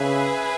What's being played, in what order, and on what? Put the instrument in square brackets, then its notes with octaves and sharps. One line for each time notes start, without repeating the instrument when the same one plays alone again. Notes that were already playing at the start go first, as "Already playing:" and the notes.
Already playing: [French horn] C#3 [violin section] G#4 B4 E5 G#5